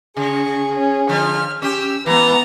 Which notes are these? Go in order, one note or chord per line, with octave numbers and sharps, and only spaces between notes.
C#3 G#4 C#6
C#4
D3 F3 F6
C#4 G4 E6
E3 B3 B4 A#5 A6